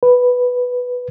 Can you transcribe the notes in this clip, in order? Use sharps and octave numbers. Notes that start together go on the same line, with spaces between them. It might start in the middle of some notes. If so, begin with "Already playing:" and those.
B4